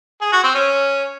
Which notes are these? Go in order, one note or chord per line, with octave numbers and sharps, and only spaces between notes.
G#4
F#4
C4
C#4